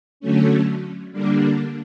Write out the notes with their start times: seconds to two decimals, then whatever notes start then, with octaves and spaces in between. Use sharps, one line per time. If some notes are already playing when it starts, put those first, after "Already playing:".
0.20 D3 F#3 A3 C#4
1.12 D3 G3 A#3 D4